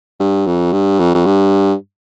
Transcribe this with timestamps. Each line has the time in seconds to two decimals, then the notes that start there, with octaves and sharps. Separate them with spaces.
0.20 G2
0.47 F2
0.73 G2
0.99 F2
1.15 F2
1.26 G2